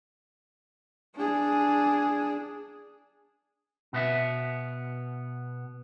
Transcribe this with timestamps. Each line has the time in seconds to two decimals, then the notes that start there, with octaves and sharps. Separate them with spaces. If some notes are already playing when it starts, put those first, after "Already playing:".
1.16 D4 G#4
3.93 B2 B3 E5